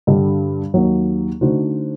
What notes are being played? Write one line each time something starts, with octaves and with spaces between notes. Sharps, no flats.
G2 D3 G3
D#2 D#3 F#3
D3 A3 D#4 F#4 C5